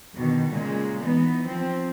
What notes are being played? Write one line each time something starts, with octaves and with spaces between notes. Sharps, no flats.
B2 D3 D#3
A#2 C#3 G#3 A#3
E3 B3 D#4
F3 C4